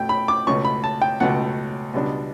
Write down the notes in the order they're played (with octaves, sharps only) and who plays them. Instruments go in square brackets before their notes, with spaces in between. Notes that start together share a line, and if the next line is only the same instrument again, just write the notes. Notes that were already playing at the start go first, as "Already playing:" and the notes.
Already playing: [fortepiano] B2 A3 G5
B5
D6
C#2 B2 A3 C#4 C#6
B5
A5
G5
C#2 B2 A3 C#4 F#5
C#2 B2 G3 B3 D4